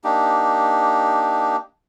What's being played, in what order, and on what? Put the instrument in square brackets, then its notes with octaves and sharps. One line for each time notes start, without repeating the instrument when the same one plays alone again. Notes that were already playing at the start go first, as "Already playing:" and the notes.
[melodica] A#3 D4 D#4 G4